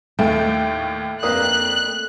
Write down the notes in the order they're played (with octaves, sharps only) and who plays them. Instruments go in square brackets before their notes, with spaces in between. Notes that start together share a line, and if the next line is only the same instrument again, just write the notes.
[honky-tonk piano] D#2 A2 G5 [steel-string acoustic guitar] A3
[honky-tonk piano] F2 D4 [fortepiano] A#3 B4 D#6 [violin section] F#6